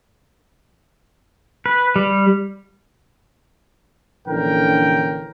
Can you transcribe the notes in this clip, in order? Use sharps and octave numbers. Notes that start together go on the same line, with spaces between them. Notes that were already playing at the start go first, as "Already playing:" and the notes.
B4
G3
A#1 D3 E3 C#4 A#4 G5